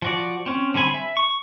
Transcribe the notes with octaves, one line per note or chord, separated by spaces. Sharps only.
F3 F#4 D5
C4 C#4
D3 G3 C4 G#5 B5
E5
C#6